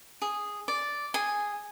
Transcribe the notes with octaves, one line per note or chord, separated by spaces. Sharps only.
G#4
D5
G#4 G#5